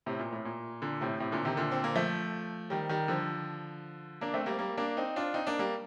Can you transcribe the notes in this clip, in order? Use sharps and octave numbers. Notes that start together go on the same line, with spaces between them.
A2 C3
A#2
A2
A#2
A#2 D3
A2 C3
A2 C3
A#2 D3
C3 D#3
A#2 D3
C4
A#3
F3 A3
D#3 G3
D#3 G3
D3 F3
A#3 D4
A3 C4
G3 A#3
G3 A#3
A#3 D4
C4 D#4
D4 F4
C4 D#4
A#3 D4
G3 A#3